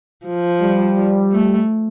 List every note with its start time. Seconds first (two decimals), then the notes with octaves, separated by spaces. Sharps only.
0.26 F3
0.61 G3
1.32 A3